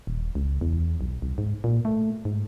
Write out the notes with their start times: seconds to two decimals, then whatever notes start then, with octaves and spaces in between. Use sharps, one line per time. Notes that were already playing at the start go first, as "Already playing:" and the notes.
0.07 D#1
0.35 C#2
0.61 E2
1.01 B1
1.22 C2
1.38 G#2
1.64 A#2
1.85 A3
2.25 G#2